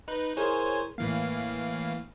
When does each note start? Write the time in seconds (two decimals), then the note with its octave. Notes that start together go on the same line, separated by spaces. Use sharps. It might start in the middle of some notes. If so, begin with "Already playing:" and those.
0.08 D#4 B4
0.37 E4 G#4 A#4 C5 C#5 G#5
0.98 A2 E3 A#3 F5